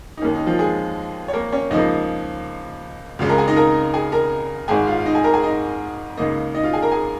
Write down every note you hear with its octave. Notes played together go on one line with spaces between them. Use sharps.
D#4
D#2 D#3 A#3 C#4
D#4
F3 F4
G#3 G#4
C#5
A#3 A#4
C#4 C#5
C#2 C#3 F3 A#3 D#4 D#5
C#2 C#3 G#3 F4 F5
A#4 A#5
G#4 G#5
D#4 D#5
A#4 A#5
G#4 G#5
A#4 A#5
G#1 G#2 G#3 G#4 G#5
F4 F5
F5
D#4 D#5
G#4 G#5
A#4 A#5
G#4 G#5
D#4 D#5
C#2 C#3 A#3 D#4 D#5
D#4 D#5
F4 F5
G#4 G#5
A#4 A#5
G#4 G#5